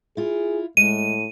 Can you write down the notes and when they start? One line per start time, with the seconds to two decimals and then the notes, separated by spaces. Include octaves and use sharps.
0.17 E4 F4 G#4
0.77 A2 G#3 D#7